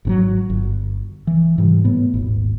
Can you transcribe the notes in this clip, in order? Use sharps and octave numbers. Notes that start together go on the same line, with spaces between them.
G#1 C3 F#3
G1
E3
G#2 C3 E3 G3
A2 B3
D#1 G#1